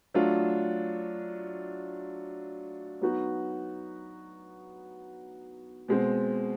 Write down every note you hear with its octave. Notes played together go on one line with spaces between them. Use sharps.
F#3 A3 D4 F4
F#3 B3 D#4 F#4
B2 G#3 C4